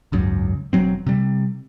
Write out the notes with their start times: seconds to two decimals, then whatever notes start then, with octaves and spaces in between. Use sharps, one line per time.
0.12 G#1 C#2 F#2
0.73 E1 F#3 C4
1.07 C3 G3